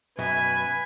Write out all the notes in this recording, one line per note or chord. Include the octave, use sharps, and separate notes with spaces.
F#2 B2 B4 E5 G#5 B5